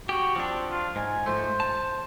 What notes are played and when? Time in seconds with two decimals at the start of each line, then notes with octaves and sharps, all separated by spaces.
0.09 F#4 G4
0.36 F3 C4 D4
0.70 F4
0.96 G#2 G#5
1.26 G#2 F3 A3 C5
1.60 A5